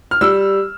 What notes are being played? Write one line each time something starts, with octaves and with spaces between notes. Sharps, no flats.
F6
G3 E6